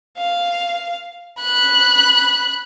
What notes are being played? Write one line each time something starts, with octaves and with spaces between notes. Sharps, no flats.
F5
B5 F#6